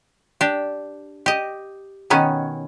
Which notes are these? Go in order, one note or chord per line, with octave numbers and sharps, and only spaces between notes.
D4 G4
G4 D#5
B2 D#3 B3 C#4